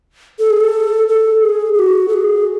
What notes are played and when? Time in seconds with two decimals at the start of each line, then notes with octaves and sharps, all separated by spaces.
0.39 A4
0.50 G#4
0.60 A4
1.09 A4
1.43 G#4
1.74 G#4
1.79 F#4
2.08 A4
2.13 G#4